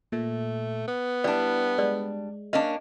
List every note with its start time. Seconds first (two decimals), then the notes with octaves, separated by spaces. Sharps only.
0.12 A#2 A3
0.88 B3
1.24 G3 D4 E4 D5
1.78 G#3 D5
2.53 A#3 C#4 D4 D#5